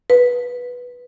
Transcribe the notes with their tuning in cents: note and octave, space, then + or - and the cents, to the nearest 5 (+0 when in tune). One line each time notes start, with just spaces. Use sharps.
B4 -10